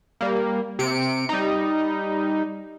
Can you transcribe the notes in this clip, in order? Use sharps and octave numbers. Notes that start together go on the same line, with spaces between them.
G3 A#3
C3 C#7 D7
G3 D#4